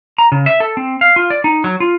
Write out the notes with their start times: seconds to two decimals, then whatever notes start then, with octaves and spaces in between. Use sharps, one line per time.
0.18 A#5
0.32 C#3
0.46 E5
0.60 A4
0.77 C4
1.01 F5
1.16 F4
1.30 D5
1.44 D#4
1.64 F#3
1.80 F4